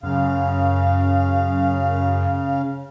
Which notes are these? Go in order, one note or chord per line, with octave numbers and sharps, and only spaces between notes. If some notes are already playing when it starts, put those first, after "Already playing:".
F#2 C#3 F5